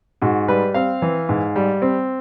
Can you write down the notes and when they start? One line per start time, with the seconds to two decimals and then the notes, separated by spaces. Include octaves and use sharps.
0.22 G#2 F#4
0.48 G3 B4
0.74 C4 F5
1.02 E3
1.29 G#2
1.56 G3
1.82 C4